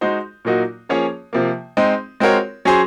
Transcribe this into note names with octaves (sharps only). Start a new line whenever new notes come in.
G#3 D#4 F#4 C5
A#2 F#3 A#3 D#4 F#4
F3 A#3 C#4 G#4 C#5
C3 F3 A#3
G#3 C4 D#4
G#3 C4 F#4 A#4 C#5
F#3 C#4 G#4 C5